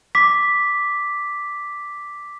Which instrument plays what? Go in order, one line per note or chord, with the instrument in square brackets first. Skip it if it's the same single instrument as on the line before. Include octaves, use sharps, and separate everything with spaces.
[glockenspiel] D6 B6